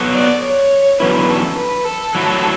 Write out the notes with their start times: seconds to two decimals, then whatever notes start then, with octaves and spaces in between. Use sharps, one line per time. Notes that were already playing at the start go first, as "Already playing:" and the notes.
Already playing: F#3 B3 F#4 A4
0.14 D5
0.43 C#5
1.00 E2 D3 F#3 C#4 E4 B4
1.29 A4
1.57 B4
1.85 A4
2.15 F#3 A3 E4